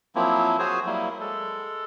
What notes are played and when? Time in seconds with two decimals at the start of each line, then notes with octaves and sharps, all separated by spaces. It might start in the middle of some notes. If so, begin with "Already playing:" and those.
0.15 F3 F#3 A#3 C4 E4
0.59 F#4 G#4 C5 C#5 G#5 D#6
0.86 F#3 G3 A#3 E4
1.20 G#3 A4